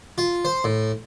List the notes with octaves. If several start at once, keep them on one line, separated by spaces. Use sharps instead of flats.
F4
C5
A2